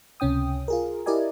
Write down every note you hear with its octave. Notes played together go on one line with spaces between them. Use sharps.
C#2 C3 C#4 G5 D#6
F4 G#4 A#4
E4 G4 A#4 D5 D#5 G#5